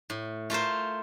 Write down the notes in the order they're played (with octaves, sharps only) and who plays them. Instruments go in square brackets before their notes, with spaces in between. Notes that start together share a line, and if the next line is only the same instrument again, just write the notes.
[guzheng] A2
A3 F4 A#4 C5